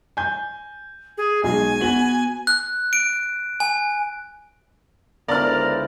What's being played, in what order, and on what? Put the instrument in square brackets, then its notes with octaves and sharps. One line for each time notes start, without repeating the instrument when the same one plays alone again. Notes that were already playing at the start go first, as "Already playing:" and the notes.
[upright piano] G#5 G6
[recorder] G#4
[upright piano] B1 G#3 [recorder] G#5
[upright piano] B3 F#4 F#7
[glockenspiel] F#6
D7
G#5
[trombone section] C#2 E4 C5 [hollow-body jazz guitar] D3 B3 [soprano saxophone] A#4 [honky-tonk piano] D5 F6